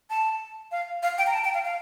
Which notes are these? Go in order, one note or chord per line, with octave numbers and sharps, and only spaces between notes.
A5
F5
F5
G5
A#5
A5
G5
F5
F5